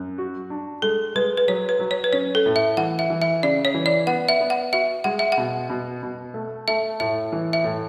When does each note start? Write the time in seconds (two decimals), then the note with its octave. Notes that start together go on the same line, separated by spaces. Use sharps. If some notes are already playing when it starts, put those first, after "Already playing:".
Already playing: F#2
0.18 F#4
0.50 D4
0.82 G#3 A4
1.16 G#3 B4
1.38 B4
1.48 F#3 C#5
1.69 B4
1.80 F#3
1.91 C#5
2.04 B4
2.13 C#4 C#5
2.35 A4
2.46 A2
2.56 E5
2.77 E3 F#5
2.99 E5
3.10 E3
3.22 E5
3.43 C#3 D5
3.65 C#5
3.74 E3
3.86 D5
4.07 B3 F#5
4.29 E5
4.40 B3
4.50 F#5
4.73 F#4 E5
5.04 G#3 F#5
5.19 E5
5.32 F#5
5.38 B2
5.70 B2
6.03 B2
6.34 A3
6.68 A3 E5
7.00 A2 E5
7.32 E3
7.53 E5
7.64 A2